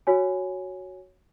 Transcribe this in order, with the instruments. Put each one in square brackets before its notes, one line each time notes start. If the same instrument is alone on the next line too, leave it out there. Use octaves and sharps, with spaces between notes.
[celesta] F#4 C#5 G#5